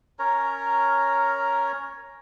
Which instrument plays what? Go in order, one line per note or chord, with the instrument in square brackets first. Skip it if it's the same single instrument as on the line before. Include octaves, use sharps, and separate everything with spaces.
[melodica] C#4 A#4 C#5 A#5